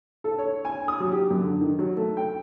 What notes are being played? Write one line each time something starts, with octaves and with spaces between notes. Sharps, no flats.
A4
C#5
G#5
D#6
F#3
G4
F#2
D3
D#3
F#3
A3
G5